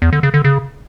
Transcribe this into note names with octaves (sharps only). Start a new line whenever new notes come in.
E2
D3
C#3
D3
C#3